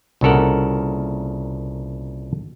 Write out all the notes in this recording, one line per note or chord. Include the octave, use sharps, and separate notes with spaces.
C2 A#2 C#3 A4 A#4 F#5